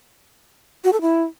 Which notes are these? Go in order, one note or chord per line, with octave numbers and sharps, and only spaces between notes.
F#4
A4
E4